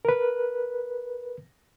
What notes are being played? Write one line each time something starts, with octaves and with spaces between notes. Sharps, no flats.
A#4 B4